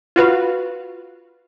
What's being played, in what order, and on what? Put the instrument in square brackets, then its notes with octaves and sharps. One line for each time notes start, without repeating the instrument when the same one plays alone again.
[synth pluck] F4 F#4 B4 F5